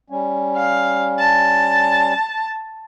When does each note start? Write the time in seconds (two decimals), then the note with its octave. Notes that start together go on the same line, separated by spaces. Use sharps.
0.10 G3 C#4
0.57 F5
1.19 A5